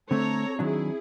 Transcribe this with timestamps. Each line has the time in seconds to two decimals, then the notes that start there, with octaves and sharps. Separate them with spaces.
0.11 D3 A3 C4 A4 C#5 A#5
0.59 D#3 F#3 D4 E4 G#4